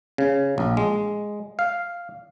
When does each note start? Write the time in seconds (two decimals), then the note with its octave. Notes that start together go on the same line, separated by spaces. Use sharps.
0.18 C#3
0.58 A#1
0.77 G#3
1.59 F5